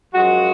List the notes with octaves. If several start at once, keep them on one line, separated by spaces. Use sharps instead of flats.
F#2 F3 G#3 F#4